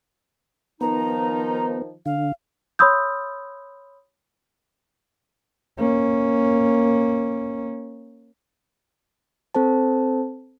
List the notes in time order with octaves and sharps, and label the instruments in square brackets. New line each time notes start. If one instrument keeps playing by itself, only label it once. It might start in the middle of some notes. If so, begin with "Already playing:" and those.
[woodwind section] D#3 F3 D#4 [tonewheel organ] B3 [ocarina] A#5
[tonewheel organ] D3 [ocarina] F5
[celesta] C#5 B5 C6 D#6 E6 G6
[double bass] A#3 C#4
[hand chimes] C4 A4 C5 A5